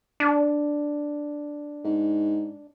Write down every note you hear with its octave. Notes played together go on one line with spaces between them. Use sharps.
D4
G#2